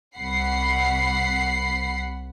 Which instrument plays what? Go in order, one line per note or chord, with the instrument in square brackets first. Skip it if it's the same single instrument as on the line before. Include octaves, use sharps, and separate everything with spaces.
[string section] C2 F#5 B5 C7